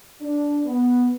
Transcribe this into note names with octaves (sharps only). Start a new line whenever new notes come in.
D4
B3